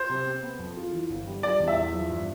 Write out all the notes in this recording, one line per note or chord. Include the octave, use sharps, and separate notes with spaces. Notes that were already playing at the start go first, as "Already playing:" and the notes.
Already playing: C5
C3
C4
B3
F2
F4
E3
G1
G3
G3 D5
E2
E5
E2
F3
G2